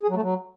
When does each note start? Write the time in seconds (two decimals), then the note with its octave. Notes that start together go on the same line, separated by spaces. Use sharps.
0.03 G#4
0.09 F#3
0.16 A3
0.22 F#3